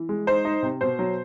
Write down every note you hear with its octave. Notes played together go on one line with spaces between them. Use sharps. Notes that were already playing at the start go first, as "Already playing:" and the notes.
Already playing: E3
G#3
D#4 C5
D#4
C3
B2 C5
F#3